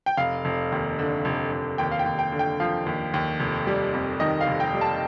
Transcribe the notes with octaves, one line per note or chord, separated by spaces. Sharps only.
G5
F1 F5
F1
D#2
D3
F1
F1
D#2 G5
F5
G5
D#2
G5
D3
G5
F3 F5
D#2
D#2
F1
G3
F2
D#3 D#5
F5
F1
G5
G3
A5